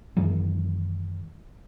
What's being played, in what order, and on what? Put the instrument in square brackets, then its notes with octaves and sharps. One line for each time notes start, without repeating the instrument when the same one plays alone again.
[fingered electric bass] F#2 D#3 E3 G#3